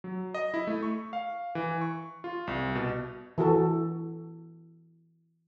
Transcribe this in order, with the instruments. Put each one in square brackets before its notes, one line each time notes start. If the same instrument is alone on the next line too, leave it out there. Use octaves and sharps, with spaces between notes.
[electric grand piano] F#3
D#5
E4
A3
C#6
F5
E3
C#6
F4
C2
B2
[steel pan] E3 F#4 A4